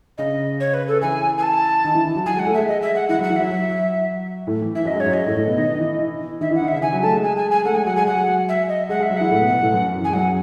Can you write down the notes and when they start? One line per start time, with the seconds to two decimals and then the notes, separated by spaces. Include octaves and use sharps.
0.18 C#3 C#4 D#5
0.60 C#5
0.74 B4
0.88 A4
1.01 E3 E4 G#5
1.38 G#5
1.43 A5
1.85 D#3 D#4
1.95 E3 E4
2.05 E3 E4
2.15 F#3 F#4
2.26 F#3 F#4 G#5
2.36 G#3 G#4 F#5
2.47 A3 A4
2.54 G#3 G#4 E5
2.68 D#5
2.82 E5
2.95 F#5
3.09 E3 E4 F#5
3.19 F#3 F#4 F#5
3.30 E3 E4
3.36 F#3 F#4 E5
3.50 F#3 F#4
4.47 A2 A3
4.61 E3
4.75 E3 E5
4.85 F#2 F#3 D#5
4.95 G#2 G#3 C#5
5.06 F#2 F#3
5.13 D#5
5.26 A2 A3
5.37 A2 A3
5.47 B2 B3
5.58 D#3 D#4
5.79 E3 E4
5.99 E3 E4
6.41 D#3 D#4 E5
6.51 E3 E4 F#5
6.61 D#3 D#4
6.68 C#3 C#4 E5
6.82 E3 E4 G#5
6.92 F#3 F#4
7.03 A3 A4 A5
7.13 G#3 G#4
7.23 G#5
7.37 G#5
7.51 G#5
7.65 A3 A4 F#5
7.75 G#3 G#4 G#5
7.86 F#3 F#4 F#5
7.96 G#3 G#4 G#5
8.07 F#3 F#4 F#5
8.49 E5
8.68 D#5
8.89 G#3 G#4 F#5
9.00 G#3 G#4 E5
9.10 F#3 F#4
9.17 E3 E4 F#5
9.31 A2 A3
9.41 B2 B3
9.52 B2 B3
9.62 A2 A3
9.73 F#2 F#3
9.86 F#2 F#3
10.00 E3 G#5
10.09 G#3
10.13 F#2 F#3 F#5